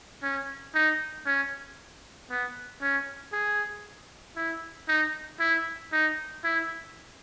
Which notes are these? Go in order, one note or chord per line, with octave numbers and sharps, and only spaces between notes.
C#4
D#4
C#4
B3
C#4
G#4
E4
D#4
E4
D#4
E4